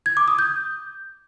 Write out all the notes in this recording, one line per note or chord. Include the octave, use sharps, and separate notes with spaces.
G#6
D6
D#6
G6